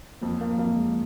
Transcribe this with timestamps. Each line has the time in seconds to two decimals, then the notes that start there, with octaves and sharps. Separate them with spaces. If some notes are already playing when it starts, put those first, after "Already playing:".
0.22 F2 A#3
0.41 A#3
0.58 F2 A#3
0.77 G#3